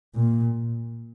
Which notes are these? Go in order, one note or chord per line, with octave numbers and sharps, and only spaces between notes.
A#2